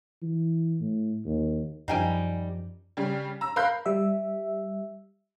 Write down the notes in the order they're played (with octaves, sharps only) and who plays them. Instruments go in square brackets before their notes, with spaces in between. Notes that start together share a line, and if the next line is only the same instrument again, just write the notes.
[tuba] E3
A2
D#2
[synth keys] F#2 F3 [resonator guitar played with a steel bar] G3 D#4 [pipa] F5 G5 G#5
[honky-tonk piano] C#3 G3
A#5 E6
A#4 F5 A#5 B5 F#6 G6
[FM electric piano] G3 E5